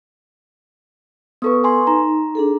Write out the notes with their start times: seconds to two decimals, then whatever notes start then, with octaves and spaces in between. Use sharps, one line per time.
1.42 B3 A4 B4 C#6 D#6
1.63 B4 G#5 C6
1.87 D#4 A#5
2.35 D4 G#4 A4